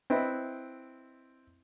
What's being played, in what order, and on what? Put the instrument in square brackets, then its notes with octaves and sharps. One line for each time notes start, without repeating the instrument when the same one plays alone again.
[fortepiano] C4 E4 B4 D#5 E5